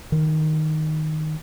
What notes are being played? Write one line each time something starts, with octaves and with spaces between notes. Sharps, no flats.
D#3